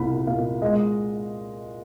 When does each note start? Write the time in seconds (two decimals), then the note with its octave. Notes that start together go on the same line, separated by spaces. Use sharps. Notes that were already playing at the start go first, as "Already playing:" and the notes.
Already playing: C2 A#2 B5
0.27 A#2 F5
0.62 G#3 D#5